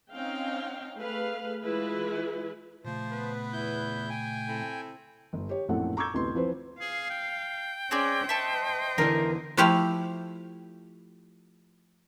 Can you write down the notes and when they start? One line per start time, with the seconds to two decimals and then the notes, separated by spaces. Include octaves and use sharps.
0.13 C4 C#4 D#4 F5 G5
0.99 A3 G#4 B4 F5
1.62 E3 G#3 E4 F4 G#4 B4
2.85 A#2 C#3 F3 A3 C5
3.12 B3 B4
3.53 E2 E4 G6
4.10 G5 G#5
4.48 C4 E4 A4
5.33 G1
5.49 G4 C#5
5.68 A#1 F#2 A2 C4 A4 F#5
5.97 A#5 C#6 D6 E6 G6 G#6
6.13 A1 D2 C3 B3 C6
6.34 E3 F3 C4 B4 C5
6.81 G#4 F5
7.10 G5
7.91 C4 C#4 G#4 D5
8.29 C5 D#5 E5 A5 C#6
8.98 E2 D3 E3 A#4
9.57 F3 A3 E4 G4 C5 F5